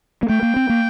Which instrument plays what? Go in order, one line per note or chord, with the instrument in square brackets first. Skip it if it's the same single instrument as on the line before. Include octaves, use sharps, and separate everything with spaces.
[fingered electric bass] A#3
[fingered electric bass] A3 [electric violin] G5
[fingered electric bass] A#3
C4
A#3